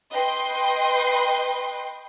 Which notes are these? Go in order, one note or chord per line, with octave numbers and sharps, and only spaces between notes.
B4 D#5 G5 C6